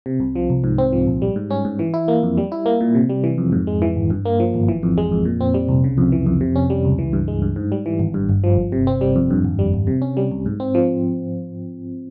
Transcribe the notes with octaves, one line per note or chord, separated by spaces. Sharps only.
C3
C2
F3
C2
G#2
C4
F3
A#1
G3
G#2
C#4
G#2
E3
E4
A#3
F2
G3
E4
A#3
A#2
C3
G3
E3
F2
G#2
G#3
E3
G#1
G2
A#3
F3
G#1
E3
F2
G#3
F2
A#2
C4
G3
C2
C#3
F2
E3
F2
C3
C#4
G3
C#2
E3
G2
G#3
G2
G#2
G3
E3
G#1
G2
G1
F3
G1
C3
C4
G3
F2
G2
G#1
G3
G#1
C3
C#4
G3
C2
G#2
C4
F3